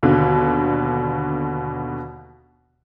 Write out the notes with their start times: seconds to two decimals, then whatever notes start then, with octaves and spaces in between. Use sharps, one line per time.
0.03 D#2 B2 D3